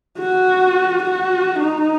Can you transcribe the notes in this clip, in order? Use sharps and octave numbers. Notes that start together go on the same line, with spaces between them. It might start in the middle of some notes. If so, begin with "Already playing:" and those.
F#4
F#4
D#4